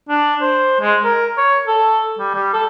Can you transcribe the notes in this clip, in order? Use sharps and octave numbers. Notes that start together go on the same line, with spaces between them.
D4
C5
G#3
A#4
C#5
A4
G3
G3
A4